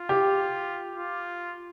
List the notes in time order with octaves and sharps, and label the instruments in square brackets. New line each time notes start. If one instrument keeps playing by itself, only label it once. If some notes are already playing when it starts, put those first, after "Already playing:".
Already playing: [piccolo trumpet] F4
[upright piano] G4
[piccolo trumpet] F4